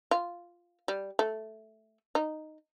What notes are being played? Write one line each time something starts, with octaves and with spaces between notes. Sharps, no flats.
F4
G3
A3
D#4